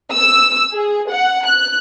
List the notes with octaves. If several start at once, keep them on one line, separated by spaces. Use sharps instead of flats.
E6
G#4
F#5
F#6